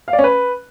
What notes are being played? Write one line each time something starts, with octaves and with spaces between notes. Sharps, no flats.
F5
D5
C#4
B4